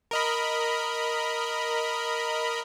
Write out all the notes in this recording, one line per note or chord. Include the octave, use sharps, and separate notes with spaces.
A#4 D#5 B5